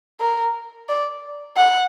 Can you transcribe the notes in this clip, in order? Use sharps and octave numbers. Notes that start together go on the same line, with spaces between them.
A#4
D5
F#5